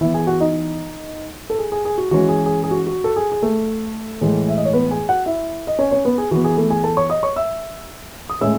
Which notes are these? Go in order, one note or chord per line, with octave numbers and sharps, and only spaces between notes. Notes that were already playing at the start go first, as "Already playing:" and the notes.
E3 B3 E4 E5
G#4 G#5
F#4 F#5
D#4 D#5
A4
G#4
G#4
G#4
F#4
E3 G#3 C#4 F#4
G#4
G#4
G#4
F#4
F#4
A4
G#4
G#4
A3 A4
A2 E3 G#3
E5
D#5
C#5
B3 B4
G#4 G#5
F#4 F#5
E4 E5
D#5
C#4 C#5
C#4 C#5
B3 B4
G#4
E3 B3 F#4
G#4
A3 A4
G#4 G#5
A4 A5
C#5 C#6
D#5 D#6
C#5 C#6
E5 E6
D#6
A2 G#3 C#4 E5 E6